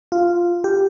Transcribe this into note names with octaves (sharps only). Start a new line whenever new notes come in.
F4
G4